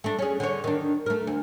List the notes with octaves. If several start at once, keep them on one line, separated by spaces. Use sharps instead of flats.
A3 D4
C#4 G#4
D3 C#5
D#3 D4
A3 A#4
D2